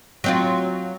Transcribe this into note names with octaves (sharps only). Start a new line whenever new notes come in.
F#3 C4 F4